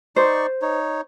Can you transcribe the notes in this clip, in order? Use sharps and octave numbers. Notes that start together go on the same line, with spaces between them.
D#4 C5 D5 C#6
D#4 C#5